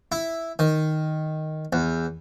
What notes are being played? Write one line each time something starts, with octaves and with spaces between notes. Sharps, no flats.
E4
D#3
E2